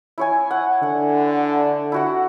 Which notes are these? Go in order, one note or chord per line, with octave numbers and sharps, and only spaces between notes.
E4 C#5 G#5
F#5
D3 F#5
E4 F#4 F#5